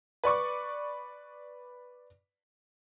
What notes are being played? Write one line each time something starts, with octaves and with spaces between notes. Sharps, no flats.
B4 D5 C#6 D6